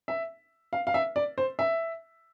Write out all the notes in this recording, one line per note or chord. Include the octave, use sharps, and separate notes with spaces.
E5
F5
F5
E5
D5
C5
E5